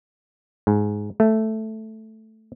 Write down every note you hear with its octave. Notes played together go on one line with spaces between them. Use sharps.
G#2
A3